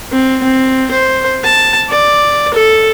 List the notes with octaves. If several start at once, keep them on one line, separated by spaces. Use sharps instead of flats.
C4
C4
C5
A5
D5
A4